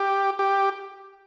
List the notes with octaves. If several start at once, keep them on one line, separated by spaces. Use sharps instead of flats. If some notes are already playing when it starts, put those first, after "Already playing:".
Already playing: G4
G4